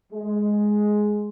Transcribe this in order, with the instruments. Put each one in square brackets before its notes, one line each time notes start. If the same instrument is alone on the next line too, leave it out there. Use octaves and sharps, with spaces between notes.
[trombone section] G#3